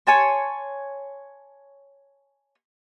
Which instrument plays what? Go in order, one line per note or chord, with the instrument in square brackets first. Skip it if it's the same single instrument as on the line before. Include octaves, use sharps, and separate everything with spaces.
[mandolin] C#5 G#5 A5 C6